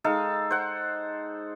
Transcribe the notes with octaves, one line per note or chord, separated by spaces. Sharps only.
G#3 D#4 A4 F5
C5 F#5